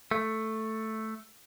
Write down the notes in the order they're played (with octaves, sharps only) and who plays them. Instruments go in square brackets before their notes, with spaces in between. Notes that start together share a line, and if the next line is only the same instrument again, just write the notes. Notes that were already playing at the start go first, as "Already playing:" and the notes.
[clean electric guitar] A3